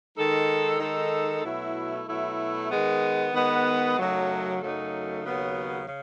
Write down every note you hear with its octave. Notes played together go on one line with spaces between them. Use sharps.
D#3 G#3 D#4 A4
D#3 G#3 D#4 A4
B2 F#3 A3 E4
B2 F#3 A3 E4
D#3 G#3 B3
D#3 G#3 B3
F#2 C#3 F#3 A3 D#4
F#2 C#3 F#3 A3 D#4
D#2 C#3 F#3 B3
C#3